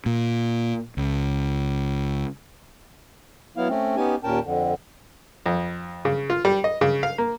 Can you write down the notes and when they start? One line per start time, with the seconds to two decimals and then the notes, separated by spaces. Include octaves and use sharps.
0.06 A#2
0.97 C#2
3.57 F#3 B3 E4 F5
3.69 A3 C4 C#4
3.97 B3 C#4 D#4 G4 G#5
4.24 D#2 A#2 C#4 A#4 G5 A5
4.44 F2 D3
5.46 F2
6.05 C#3
6.30 F4
6.45 G3
6.64 D#5
6.81 C#3
7.03 F5
7.18 A#3